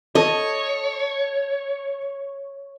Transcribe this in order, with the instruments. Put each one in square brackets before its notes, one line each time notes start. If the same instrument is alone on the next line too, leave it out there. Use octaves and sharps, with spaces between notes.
[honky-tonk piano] A4 [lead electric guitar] C#5 [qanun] D#5